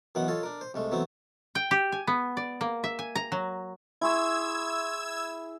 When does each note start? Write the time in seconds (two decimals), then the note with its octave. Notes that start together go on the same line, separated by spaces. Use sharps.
0.15 F#2 D#3 E3 B3 F#5
0.28 F4 A4 C#5 D#5
0.43 D4 A#4
0.61 C5
0.74 C2 G#3 A3
0.91 E3 F#3 A3 B3 C4
1.55 G5
1.71 G4
1.92 G#5
2.07 B3
2.37 D5
2.61 A#3
2.84 E5
2.99 G#5
3.16 A#5
3.32 F#3
4.01 E4 G#4 E5 C6 C#6 E6 G#6